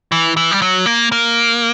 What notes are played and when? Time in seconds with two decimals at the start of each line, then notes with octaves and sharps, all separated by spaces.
0.12 E3
0.37 E3
0.51 G3
0.62 F#3
0.86 A#3
1.12 A#3